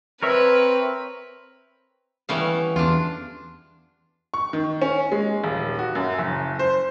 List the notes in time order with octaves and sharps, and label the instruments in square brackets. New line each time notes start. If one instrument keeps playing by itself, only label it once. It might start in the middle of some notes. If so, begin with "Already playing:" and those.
[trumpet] C4 [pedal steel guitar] A#4 C#5 E5 [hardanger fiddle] B4
[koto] E3 G3 F5 [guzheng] A3 B3 C#4
[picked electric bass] E2 [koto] D4 F4
[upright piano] C#6
D#3
C#4
G#3
D#1
F#4
F#2
F#1
C5